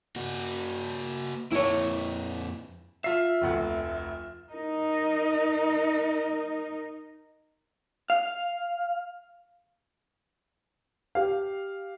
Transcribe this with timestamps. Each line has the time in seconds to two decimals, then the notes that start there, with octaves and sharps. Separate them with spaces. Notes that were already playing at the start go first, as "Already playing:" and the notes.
0.16 A#3 F#4
1.52 F2 A#3 E4 C#5
3.04 F4 E5 C7
3.41 F1 D2 F#5
4.52 D#4 A#4
8.10 F5
11.15 G4 F5